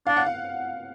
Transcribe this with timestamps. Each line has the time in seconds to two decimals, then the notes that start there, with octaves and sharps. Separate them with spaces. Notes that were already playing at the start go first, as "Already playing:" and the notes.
0.07 D4 F5
0.16 F#5
0.26 F5